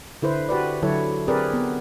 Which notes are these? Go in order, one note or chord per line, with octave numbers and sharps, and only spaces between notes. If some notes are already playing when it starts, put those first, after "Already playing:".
D3 E4 B4 C5
F#4 G4 B4 D5
D3 F#3 E4 A4 C#5
C4 G4 G#4 A#4 B4 D5
B3